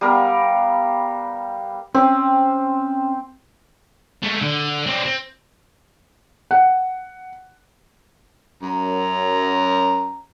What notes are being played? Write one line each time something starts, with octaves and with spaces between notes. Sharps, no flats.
G3 B3 A#4 F5
C4 C#4
G#3 A3
D3
C4 D4
C4
F#5
F#2 A#5